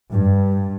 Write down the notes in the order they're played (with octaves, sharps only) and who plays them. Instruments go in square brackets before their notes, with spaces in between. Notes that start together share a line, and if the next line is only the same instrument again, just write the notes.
[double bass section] G2